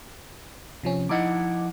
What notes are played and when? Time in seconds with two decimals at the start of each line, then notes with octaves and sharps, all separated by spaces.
0.83 C3 F3 C#4
1.09 F3 D#4 E4 F#5 D6